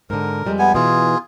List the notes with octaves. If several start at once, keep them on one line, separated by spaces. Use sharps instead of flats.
G#2 D3 A#4
F2 G3 G#3
B3 G#5
B2 E3 F4 G#4